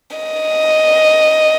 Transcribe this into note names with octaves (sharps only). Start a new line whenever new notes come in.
D#5